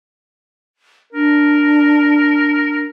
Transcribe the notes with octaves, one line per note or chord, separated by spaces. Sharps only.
D4 A#4